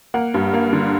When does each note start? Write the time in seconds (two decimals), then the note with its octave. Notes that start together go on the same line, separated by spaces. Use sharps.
0.14 A#3 F#5
0.34 G2
0.54 A#3
0.73 D3